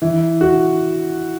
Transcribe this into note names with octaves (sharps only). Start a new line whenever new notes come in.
E3
F#4